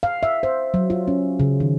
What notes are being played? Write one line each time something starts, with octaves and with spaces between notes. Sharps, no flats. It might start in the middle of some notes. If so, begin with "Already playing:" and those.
F5
E5
C5
F#3
F4
C#4
C#3
D#3